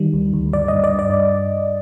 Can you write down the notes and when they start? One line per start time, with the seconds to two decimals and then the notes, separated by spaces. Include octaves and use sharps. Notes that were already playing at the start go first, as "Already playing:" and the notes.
Already playing: D#3 G3
0.13 D2
0.33 D2
0.53 G2 D5
0.68 G2 D#5
0.84 D5
0.94 G2
0.99 D5